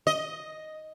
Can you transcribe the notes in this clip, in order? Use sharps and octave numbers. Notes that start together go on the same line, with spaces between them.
D#5